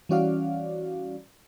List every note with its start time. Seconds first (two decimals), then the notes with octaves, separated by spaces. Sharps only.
0.09 E3 G3 C#4 F#4 D5 F5